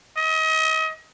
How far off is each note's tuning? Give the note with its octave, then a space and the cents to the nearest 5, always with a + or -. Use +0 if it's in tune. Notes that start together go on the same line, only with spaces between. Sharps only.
D#5 +35